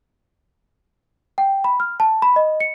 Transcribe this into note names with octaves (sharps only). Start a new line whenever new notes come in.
G5
B5
F6
A5
B5
D#5
C#7